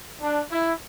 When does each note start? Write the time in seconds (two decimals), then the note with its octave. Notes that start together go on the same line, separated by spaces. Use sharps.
0.21 D4
0.50 E4